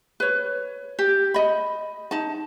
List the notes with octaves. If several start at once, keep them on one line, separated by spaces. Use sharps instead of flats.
B4 C#5
G4
D#5 B5
D#4 A5